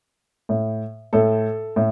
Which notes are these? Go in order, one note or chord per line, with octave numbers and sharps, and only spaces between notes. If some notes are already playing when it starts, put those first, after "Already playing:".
A2
A2 A4
A2